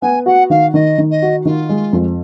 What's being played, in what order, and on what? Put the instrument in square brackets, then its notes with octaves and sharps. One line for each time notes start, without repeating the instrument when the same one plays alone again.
[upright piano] B3 [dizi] G#5
[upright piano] F#4 [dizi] F#5
[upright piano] D#3 [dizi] F5
[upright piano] D#3 [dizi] D#5
[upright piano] D#3
[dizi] D#5
[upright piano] F#4
[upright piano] D#3 [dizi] F4
[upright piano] G#3
F2